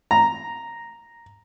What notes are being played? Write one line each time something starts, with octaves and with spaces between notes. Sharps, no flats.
A#5